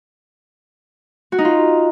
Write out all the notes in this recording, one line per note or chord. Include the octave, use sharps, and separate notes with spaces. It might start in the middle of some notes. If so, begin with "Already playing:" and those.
F#4
D#4
F4